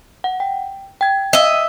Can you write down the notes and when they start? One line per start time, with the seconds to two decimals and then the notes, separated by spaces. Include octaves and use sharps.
0.24 F#5
0.40 G5
1.01 G5 G#6
1.33 D#5 E5